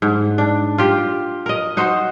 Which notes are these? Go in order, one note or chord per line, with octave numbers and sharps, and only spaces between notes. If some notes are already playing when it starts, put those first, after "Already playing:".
G#2
D4
F4 G4
A#4 D#5
D#4 F#4 C5